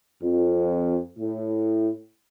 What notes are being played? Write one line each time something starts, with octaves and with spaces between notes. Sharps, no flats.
F2
A2